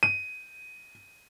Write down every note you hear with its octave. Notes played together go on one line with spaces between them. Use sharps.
D#7